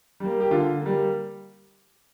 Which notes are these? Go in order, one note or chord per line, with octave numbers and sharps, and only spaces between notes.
G3 A#3
G4
D3 F4
G3 A#3